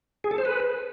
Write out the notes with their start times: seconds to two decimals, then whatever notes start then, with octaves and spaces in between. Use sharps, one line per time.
0.24 G#4
0.31 A4
0.38 C5
0.45 B4